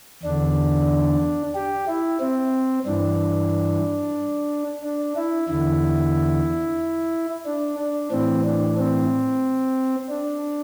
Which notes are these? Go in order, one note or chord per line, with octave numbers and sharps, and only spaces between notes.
E2 D3 D4
G4
E4
C4
G2 E3 D4
D4
E4
E2 D3 E4
D4
D4
A2 E3 C4
D4
C4
D4